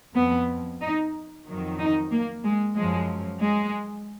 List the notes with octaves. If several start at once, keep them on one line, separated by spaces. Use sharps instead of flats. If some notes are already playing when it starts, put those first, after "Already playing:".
F2 F3 B3
D#4
F2 D#3 F#3
D#4
A#3
G#3
F#2 F3 G#3
G#3